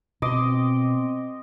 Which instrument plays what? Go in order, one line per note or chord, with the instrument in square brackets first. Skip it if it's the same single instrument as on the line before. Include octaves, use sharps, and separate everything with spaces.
[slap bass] B2 [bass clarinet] C4 [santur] D#5 C6 D6